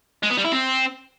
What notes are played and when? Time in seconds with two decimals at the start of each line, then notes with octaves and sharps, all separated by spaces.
0.23 G#3
0.30 B3
0.38 G3
0.45 E4
0.52 C4